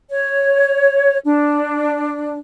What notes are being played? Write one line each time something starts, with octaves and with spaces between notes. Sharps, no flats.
C#5
D4